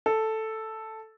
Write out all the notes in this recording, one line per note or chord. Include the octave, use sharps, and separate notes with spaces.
A4